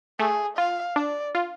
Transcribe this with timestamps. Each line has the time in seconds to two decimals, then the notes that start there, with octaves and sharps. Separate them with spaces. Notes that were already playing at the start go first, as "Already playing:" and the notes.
0.19 A3 G#4
0.58 F4 F5
0.96 D4 D5
1.35 F4